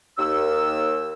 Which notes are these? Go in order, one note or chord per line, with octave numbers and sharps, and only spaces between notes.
D#2 E6